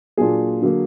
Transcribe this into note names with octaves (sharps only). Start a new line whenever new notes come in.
A#2 F#3 A#3 D4 F4 G#4
D3 F#3 A#3